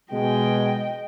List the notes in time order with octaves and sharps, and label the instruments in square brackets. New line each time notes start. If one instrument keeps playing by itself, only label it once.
[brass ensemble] B2 G#3 [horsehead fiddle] D#5 G5